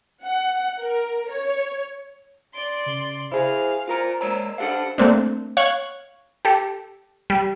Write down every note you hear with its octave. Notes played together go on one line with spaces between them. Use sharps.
F#5
A#4
C#5
D5 C6 D7
C#3
E4 G#4 C5 F5
F4 A#4 A#5
G#3 A#3 C#5 A#5 E6
D4 G4 A4 F5 F#5
A3 A#3 C4 D4
C#5 F5 C#6 F#6 G#6
G4 A4
G3